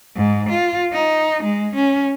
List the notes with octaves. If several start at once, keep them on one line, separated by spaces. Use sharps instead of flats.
G#2
F4
D#4
G#3
C#4